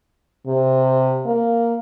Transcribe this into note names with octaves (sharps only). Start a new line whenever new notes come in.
C3
A#3